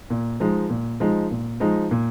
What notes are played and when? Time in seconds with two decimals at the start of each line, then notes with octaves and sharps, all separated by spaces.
0.10 A#2
0.40 F3 G#3 D#4
0.70 A#2
1.00 F3 G#3 D#4
1.31 A#2
1.60 F3 G#3 D#4
1.91 A#2